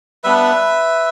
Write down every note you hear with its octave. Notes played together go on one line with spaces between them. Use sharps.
G3 B3 D4 B4 E5